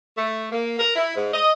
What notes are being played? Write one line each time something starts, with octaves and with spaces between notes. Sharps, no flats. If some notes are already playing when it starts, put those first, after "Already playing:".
A3
A#3
A#4
E4
G#2
D#5